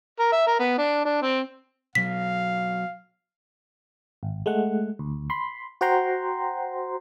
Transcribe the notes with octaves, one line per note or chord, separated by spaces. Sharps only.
A#4
E5
A#4
B3
D4
D4
C4
B2 F#3 F5 B6
G#1
G#3 A3 F#5
D2
B5 C6
F#4 C5 F#5 G5 A#5 C6